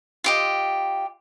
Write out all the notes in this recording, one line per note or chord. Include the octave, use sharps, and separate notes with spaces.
F4 G4 D#5